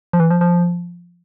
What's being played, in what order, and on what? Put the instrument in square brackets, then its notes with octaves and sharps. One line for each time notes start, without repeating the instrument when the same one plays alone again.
[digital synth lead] F3
E3
F3
F3